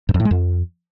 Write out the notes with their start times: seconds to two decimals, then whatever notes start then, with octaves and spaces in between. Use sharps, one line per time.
0.09 G2
0.14 F2
0.20 A2
0.25 G#3
0.31 F2